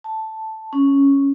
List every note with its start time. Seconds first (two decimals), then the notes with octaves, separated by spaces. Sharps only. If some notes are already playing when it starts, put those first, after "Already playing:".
0.04 A5
0.73 C#4